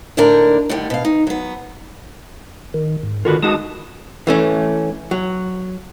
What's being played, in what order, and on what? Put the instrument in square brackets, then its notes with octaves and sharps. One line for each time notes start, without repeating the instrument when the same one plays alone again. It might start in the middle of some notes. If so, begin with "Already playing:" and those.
[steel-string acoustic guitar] D#2 A2 D3 A3 D4 A#4
A2 D3 D#3 G3
B2 F5
D#4
F#3 B3
[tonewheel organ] D#3
G#2
[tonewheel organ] D3 D#3 [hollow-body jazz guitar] F4 F#4 B4
[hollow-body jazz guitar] G#3 D#4 F#4 [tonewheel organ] A5 D#6
[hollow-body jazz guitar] E3 A3 C#4
F#3